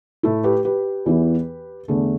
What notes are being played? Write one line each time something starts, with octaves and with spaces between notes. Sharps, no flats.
A2 A3 E4 A4
G4 B4
G4 B4
E2 E3 B3 E4
E2 D3 A3 D4